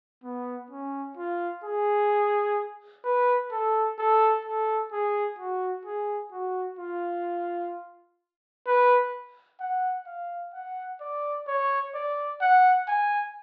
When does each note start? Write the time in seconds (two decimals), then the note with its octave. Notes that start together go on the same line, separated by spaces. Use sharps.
0.23 B3
0.70 C#4
1.17 F4
1.64 G#4
3.04 B4
3.51 A4
3.98 A4
4.45 A4
4.92 G#4
5.39 F#4
5.85 G#4
6.32 F#4
6.79 F4
8.67 B4
9.60 F#5
10.07 F5
10.54 F#5
11.01 D5
11.47 C#5
11.95 D5
12.41 F#5
12.88 G#5